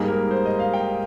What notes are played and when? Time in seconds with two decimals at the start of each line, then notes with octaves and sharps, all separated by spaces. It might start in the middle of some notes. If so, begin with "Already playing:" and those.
Already playing: G#2 G3 A#3 G#4
0.08 A#4
0.31 C5
0.46 D#5
0.59 F5
0.73 G5